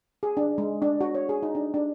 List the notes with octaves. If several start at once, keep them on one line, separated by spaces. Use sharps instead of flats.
G#4
D4
G#3
D4
F#4
C#5
G#4
D#4
D4
D4